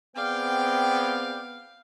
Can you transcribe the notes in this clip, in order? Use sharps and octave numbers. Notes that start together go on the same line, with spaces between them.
B3 C4 G#4 D5 F5 G5